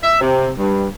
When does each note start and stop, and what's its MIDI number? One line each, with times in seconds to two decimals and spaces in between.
0.04 0.18 76
0.21 0.50 48
0.58 0.87 43